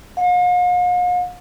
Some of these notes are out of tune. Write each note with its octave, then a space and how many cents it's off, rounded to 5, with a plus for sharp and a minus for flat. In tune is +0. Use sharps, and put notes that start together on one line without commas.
F5 +45